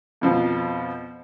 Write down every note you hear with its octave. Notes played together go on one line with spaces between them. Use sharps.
F2 B2 F3